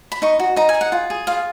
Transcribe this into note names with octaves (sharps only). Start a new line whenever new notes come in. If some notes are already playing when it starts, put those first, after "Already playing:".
B5
D#4 C#6
F#4
D#4 A#5
G#5
G#4
F#5
F4
G#4
F4 F5